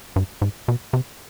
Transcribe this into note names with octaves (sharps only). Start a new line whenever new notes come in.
G2
G#2
B2
C3